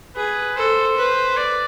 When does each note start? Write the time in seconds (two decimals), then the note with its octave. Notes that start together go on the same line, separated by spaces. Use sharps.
0.16 G#4 B4
0.57 A4 C5
0.97 B4
1.37 D5